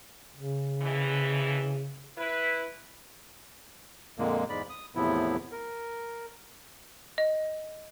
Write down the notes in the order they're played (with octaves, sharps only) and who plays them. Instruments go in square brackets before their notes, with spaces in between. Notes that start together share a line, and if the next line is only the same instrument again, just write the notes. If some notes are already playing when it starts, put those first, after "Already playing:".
[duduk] C#3
[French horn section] F2 B2 E3
E4 B4
[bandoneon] F2 A#2 D3 G#3 A#3
E2 G#2 G#3 D5 B5
D#6
E2 A2 C3 F3 B3 E4
A#4
[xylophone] D#5